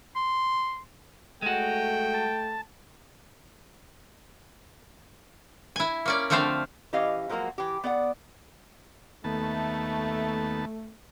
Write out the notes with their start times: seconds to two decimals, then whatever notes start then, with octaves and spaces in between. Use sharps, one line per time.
0.16 C6
1.42 G#3 A3 F#4 G5
2.14 A5
5.76 E4 G#5
6.06 A#3 C#4 D5
6.30 D3 F3 A3 C4 C5 F5
6.93 E3 C#4 G4 D#5 F5
7.29 F3 F#3 G#3 A#3 F#4
7.58 E3 G4
7.84 B3 D5 F#5
9.24 D#2 A3 B3 A5